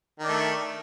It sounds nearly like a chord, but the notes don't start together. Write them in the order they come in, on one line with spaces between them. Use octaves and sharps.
D#3 D4 A3